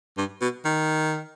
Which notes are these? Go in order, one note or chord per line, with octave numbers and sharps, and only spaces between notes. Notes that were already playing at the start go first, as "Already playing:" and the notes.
G2
B2
D#3